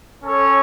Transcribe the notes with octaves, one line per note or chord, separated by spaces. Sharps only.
C#4 A4 C#5